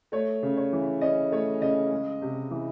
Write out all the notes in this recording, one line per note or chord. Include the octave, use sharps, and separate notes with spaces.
A3 C#5
C#3
C#5
E3
C#4 D#5
A3 C#5
C#3 D#5
G#3
C3
E3